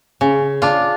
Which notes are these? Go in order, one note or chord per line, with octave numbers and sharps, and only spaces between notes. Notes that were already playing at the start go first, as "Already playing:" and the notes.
C#3
D4 F4